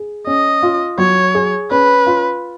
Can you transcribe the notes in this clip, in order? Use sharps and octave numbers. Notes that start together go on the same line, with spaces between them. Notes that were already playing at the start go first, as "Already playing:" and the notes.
Already playing: G#4
C#4 D#5
F4
F#3 C#5
G#4
C#4 B4
F4